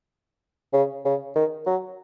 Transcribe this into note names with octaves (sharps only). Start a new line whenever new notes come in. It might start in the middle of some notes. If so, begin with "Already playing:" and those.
C#3
C#3
D#3
F#3